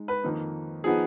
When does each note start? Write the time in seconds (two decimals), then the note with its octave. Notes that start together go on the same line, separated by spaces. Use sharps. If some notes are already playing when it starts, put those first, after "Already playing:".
Already playing: G#3 D#4
0.08 B4
0.24 F2 D#3 A#3 D#4
0.84 F3 B3 D#4 G#4